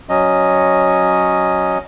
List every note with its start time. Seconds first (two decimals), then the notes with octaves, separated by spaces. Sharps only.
0.09 F#3 C#4 D#5